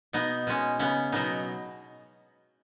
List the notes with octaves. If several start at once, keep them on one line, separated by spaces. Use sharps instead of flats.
B2 B3 D#4
B2 G#3 C#4
C#3 B3 C#4
B2 F#3 B3 D#4